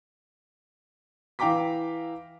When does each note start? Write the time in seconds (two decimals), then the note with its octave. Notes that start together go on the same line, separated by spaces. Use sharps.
1.39 E3 F5 G5 A#5 D6 B6